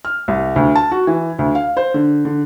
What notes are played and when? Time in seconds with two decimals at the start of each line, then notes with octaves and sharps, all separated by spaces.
0.05 F6
0.28 C2
0.56 D2
0.75 A5
0.91 F#4
1.07 E3
1.39 D2
1.55 F5
1.77 C5
1.94 D3
2.25 D3